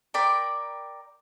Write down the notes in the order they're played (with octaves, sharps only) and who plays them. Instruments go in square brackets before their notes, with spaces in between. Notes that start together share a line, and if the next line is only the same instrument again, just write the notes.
[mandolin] A#4 D5 G5 B5